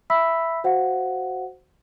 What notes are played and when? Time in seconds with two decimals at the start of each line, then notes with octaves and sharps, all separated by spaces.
0.10 E5 B5 E6 B6
0.64 F#4 C5 F5 F#5